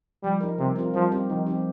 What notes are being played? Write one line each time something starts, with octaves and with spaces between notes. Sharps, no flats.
F3 G3
D#4 A#4
C3 G3
C4 F4 A#4
F3 G3
C4 G4
D#3 F3
C4 D#4 G4